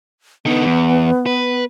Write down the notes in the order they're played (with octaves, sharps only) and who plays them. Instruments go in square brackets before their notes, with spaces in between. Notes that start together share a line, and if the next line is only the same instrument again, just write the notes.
[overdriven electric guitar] D3 D#4 [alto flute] B3
[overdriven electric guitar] E2
B4